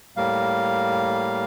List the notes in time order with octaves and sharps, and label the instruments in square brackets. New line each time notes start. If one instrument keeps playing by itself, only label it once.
[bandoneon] A2 G3 A#3 F5